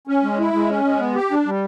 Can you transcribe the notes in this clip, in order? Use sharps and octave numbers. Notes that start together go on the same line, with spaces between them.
C#4
G#3
E4
G#3
C#4
G#3
B3
G4
D4
G3